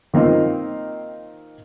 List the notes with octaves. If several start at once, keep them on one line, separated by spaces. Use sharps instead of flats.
D#3 A#3 C4 D#4 F4